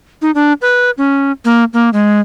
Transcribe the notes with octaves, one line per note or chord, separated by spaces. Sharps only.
D#4
D4
B4
C#4
A#3
A#3
G#3